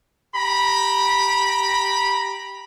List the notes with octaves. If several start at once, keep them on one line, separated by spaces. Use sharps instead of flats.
G4 A#5 B5